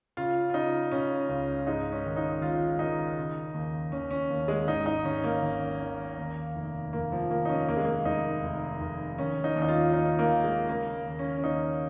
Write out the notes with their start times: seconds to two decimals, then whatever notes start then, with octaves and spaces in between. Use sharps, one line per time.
0.17 C#3 F4
0.50 F4
0.54 C#3 D#4
0.92 C#3 C#4
1.29 C#2
1.67 G#2 D#4
1.92 C#4
2.04 D#3
2.16 D#4
2.42 G#1 F4
2.79 D#3 D#4
3.17 C#3
3.54 D#2
3.92 D#2 C#4
4.11 C#4
4.30 D#2
4.48 G#3
4.67 G#1 D#4
4.86 D#4
5.04 G#1 C#4
5.24 A#3
5.43 G#1
5.80 D#3
6.18 D#2
6.55 F1
6.93 F1 A#3
7.12 F3
7.30 D#2 A#3
7.45 D#4
7.49 C#4
7.68 F1 A#3
7.77 G#3
7.85 A#3
8.05 F1 D#4
8.43 F1
8.80 F1
9.18 D#3 C#4
9.44 D#4
9.56 D#2
9.62 D#4
9.68 F4
9.93 D#2 D#4
10.19 A#3
10.32 D#3
10.44 G#3
10.68 C#3 A#3
11.06 D#2
11.19 C#4
11.37 C#4
11.44 D#2 D#4